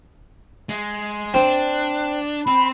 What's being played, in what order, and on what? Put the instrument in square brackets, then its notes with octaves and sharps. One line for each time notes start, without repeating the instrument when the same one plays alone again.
[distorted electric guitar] G#3
[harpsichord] C4 [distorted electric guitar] D4
[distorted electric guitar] C4 [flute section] B5